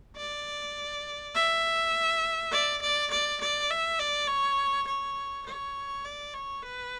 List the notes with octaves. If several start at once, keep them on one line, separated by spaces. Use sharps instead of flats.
D5
E5
D5
D5
D5
D5
E5
D5
C#5
C#5
C#5
D5
C#5
B4